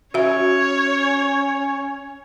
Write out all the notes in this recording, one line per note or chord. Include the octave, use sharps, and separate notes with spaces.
C#4 F#4 C#5 E5